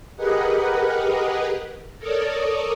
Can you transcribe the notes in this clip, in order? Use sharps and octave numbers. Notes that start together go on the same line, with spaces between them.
G4 G#4 A#4 B4 D#5 F#5
A4 A#4 C#5 D5 D#6